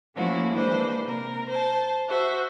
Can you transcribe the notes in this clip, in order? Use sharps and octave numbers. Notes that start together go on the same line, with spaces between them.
F3 A3 A#3 C#4 E4 F#4
E3 G#3 A#3 D4 B4 C5
C3 A#4
C5 A5
F#4 C5 E5